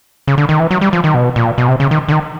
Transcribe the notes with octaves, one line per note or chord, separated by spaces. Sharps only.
C#3
D3
D#3
E3
F#3
G3
F3
D#3
B2
A#2
B2
C3
C#3
D#3
D3
D#3